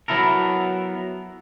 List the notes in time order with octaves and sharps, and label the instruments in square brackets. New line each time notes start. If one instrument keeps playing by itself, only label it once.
[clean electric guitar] F#3 B3 E4 A4 A#4